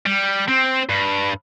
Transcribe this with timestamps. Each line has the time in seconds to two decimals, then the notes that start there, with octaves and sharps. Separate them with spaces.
0.06 G3
0.49 C4
0.89 G2